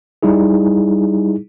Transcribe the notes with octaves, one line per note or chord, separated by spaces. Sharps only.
G3 D#4 E4 G#4